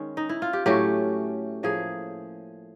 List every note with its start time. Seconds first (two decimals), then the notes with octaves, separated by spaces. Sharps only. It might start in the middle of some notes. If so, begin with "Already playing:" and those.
Already playing: D#3 G#3 C#4
0.17 D#4
0.29 E4
0.42 F4
0.53 G4
0.66 A2 F#3 A3 C#4 G4
1.63 A2 F3 A#3 G#4